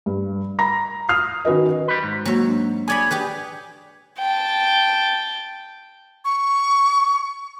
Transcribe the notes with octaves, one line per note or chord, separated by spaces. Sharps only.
G2
A#5 B5 A#6
D#6 F6 C7
D#3 C#4 F#4 B4 D#5
G3 B4
G#2
F#3 A#3 F#4 C#5
D4
G#4 C#5 D5 G#5 B5
G4 G#4 B4
G5 A5
C#6